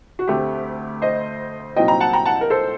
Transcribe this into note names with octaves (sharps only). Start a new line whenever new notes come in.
F#4
D2 D3 A3 C4 G4
C5 D#5
C2 A#2 F#3 C4 D#4 D#5 G5
G5 A#5
F#5 A5
G5 A#5
F#5 A5
A#4
A4 C5